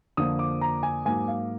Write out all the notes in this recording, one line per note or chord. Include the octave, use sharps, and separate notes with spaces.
F2 D3 F3 A#3 D#6
D6
A#5
G#5
G#2 F#3 A#3 G#5
F5